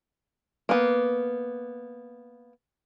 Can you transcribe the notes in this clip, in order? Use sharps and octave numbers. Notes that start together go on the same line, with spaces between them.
A#3 B3